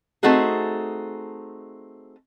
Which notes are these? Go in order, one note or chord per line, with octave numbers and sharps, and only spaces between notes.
A3 C4 D#4 F#4 G#4